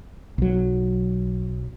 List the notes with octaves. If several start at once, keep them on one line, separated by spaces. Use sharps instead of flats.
B1 F#3